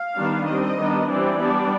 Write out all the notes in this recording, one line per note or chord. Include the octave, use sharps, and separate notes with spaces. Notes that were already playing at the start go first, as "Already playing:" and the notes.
Already playing: F5
D#3 G3 B3 D4
G3 C4 D#5
D#3 G3 B3 D4
E3 G3 C4 D5
G3 B3 D4